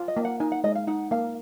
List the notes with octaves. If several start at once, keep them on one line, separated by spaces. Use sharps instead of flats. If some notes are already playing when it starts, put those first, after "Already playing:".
Already playing: F4
D#5
A#3
F#5
D#4 G#5
F#5
G#3 D#5
F5
D#4 F#5
A#3 F5